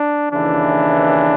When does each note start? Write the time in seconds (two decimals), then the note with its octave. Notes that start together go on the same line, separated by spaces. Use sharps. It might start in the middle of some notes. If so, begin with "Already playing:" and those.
Already playing: D4
0.32 D#2 C#3 E3 D4